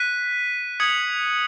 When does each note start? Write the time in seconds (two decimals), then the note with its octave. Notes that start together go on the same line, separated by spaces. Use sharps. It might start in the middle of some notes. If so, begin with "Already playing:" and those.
Already playing: F#6 B6 D#7
0.80 D#6 G#6 C#7 F#7